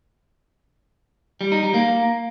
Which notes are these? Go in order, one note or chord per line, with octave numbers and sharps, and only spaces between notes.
G3
D#4
G3
A#3